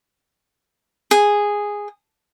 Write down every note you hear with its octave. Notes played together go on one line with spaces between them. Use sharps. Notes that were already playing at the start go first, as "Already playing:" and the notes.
G#4